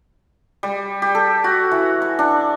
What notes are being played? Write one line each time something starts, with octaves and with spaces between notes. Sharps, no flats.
G3
G4
A4
F#4
E3
C#6
D4